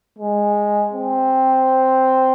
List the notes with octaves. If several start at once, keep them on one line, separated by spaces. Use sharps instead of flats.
G#3
C4